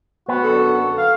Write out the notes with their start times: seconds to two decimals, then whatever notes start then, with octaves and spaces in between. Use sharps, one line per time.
0.28 B3 F#4
0.44 F#2 D3 A4
0.98 F5